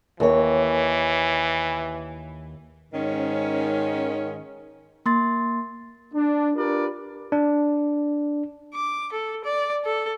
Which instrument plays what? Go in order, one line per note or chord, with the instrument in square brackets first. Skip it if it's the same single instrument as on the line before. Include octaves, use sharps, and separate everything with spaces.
[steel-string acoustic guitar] D#2 C#5 [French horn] E3
[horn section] G#2 D#3 C#4
[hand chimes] A#3 C6 A6
[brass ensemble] D4
D4 F4 G4 A#4 B4 D5
[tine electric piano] D4
[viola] D6
A4
D5
A4